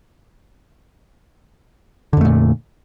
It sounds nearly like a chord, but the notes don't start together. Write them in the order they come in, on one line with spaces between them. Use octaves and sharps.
D3 F2 A3 A#2